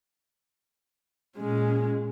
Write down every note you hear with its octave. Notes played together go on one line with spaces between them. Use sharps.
A#2 G#3 C#4